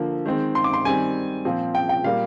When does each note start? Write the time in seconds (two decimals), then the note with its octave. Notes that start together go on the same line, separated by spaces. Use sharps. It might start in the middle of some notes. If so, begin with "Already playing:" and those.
Already playing: D3 F3 A#3
0.26 D#3 G#3 C4
0.55 C6
0.64 D6
0.73 C6
0.85 D#3 G3 C4 G#5
1.45 A#2 F3 C4
1.75 G5
1.89 G5
2.04 A#2 G3 A#3 F5